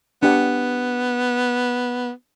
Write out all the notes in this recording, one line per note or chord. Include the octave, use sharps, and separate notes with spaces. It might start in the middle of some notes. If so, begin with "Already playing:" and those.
B3 D4 G4 F#5